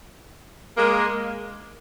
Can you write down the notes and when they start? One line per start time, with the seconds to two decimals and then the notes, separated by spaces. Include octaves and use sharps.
0.77 G#3 A#3